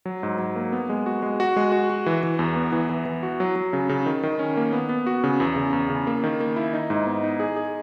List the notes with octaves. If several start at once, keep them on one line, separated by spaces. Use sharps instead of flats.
F#3
G#2
F#3
A#3
B3
G#3
F#4
G#3
F#4
G#3
F#4
F#4
E3
E3
E2
B3
E3
E3
E3
F#4
F#3
F#3
C#3
C#3
D#3
D#3
C#4
A#3
B3
B3
F#4
C#3
E2
C#3
E2
C#3
A#3
D#3
A#3
E4
D#4
G#2
B3
D#4
G#4
G#4